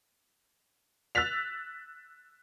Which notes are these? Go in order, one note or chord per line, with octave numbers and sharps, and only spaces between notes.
E6 F#6 A6 B6 F7